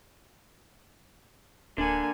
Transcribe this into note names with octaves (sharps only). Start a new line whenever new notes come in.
D1 D3 A#3 G#5